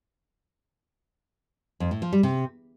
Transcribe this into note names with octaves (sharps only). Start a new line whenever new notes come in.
F2
A2
F3
G3
C3